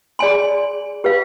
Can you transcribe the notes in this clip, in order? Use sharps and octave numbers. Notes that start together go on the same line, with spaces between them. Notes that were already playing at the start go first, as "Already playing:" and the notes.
G#4 D5 G#5 C6
G4 B4 F5